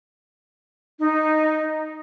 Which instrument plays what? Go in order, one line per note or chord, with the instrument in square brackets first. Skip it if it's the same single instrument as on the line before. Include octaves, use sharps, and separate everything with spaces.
[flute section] D#4